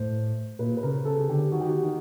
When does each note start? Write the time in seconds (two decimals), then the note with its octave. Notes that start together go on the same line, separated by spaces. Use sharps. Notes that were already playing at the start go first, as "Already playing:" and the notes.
Already playing: A2 C5
0.59 A#2 B4
0.77 B4
0.83 C#3 A#4
1.05 C#3 A4
1.19 G#4
1.29 D3 G4
1.51 D#3 F#4
1.60 G4
1.69 F#4
1.83 D#3 G4